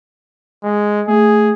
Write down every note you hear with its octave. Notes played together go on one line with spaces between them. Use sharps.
G#3
A3 G#4